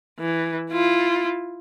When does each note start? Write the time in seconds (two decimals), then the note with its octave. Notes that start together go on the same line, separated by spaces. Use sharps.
0.19 E3
0.71 E4 F4